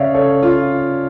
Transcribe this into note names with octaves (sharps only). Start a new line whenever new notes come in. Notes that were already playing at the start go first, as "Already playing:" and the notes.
Already playing: C#3 C#4 C#5 D5 E5 F5
A4 C#5
F4